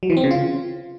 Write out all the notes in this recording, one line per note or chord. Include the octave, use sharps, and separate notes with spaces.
F#3
E3
C4
C#3
F4